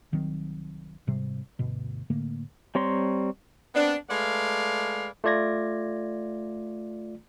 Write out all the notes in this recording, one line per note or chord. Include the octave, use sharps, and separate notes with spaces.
C2 D#3 F#3 C4
G#2 C3 G3
D2 G2 B2
A2 D3 A3 A#3
G3 C4 C#5 A#5 C6
B3 C4 D4
G#3 A3 B4 D5 F5
A3 F4 D5 G#6 A#6